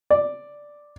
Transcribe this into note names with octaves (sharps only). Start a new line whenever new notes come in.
D5